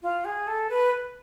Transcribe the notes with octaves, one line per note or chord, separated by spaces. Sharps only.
F4
G#4
A4
B4